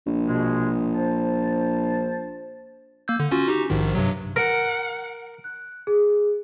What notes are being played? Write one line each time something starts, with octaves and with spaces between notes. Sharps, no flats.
A#1
B2 G#3
C5 A5
A#3 E6 G6
D3
C#4 F4 F#4
D#4 F#4 G4
A#1 G#2 D#3
G2 C3 F#3
A#4 F#5
F#6
G#4